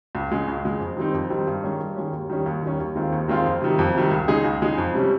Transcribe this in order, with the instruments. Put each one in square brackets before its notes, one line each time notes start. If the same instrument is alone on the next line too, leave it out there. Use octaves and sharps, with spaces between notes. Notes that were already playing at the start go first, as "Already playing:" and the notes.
[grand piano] C#2
C#3 G#3
C#2
C#3 G#3
F2
D#3 G3 C4 D#4
F2
D#3 G3 C4 D#4
G2
D#3 G#3 C#4
G2
D#3 G#3 C#4
D#2
D#3 G3 C#4
D#2
D#3 G3 C#4
D#2
D#3 G#3 C4 F4
D#2
D#3 G#3 C4 F4
F2
C3 D#3 G3
F2
C3 D#3 G3
C#2
C#3 G#3 D#4 G#4
C#2
C#3 G#3 D#4 G#4
F2
C3 G3 C#4